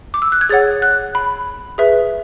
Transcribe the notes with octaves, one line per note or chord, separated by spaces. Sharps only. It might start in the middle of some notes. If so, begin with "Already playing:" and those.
D6
E6
F#6
G#6
G#4 C#5 F#5 A6
F#6
B5
G#4 B4 E5